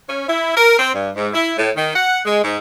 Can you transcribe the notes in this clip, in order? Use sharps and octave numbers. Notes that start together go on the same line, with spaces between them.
C#4
E4
A#4
C4
G2
G#2
E4
A2
D#3
F#5
G#3
G#2